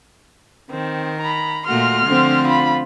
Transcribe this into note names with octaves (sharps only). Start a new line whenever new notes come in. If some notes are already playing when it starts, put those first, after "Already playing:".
D#3 C4
A#5 B5
A#2 A3 F#4 C6 F6
D3 F3 C4
F4 B5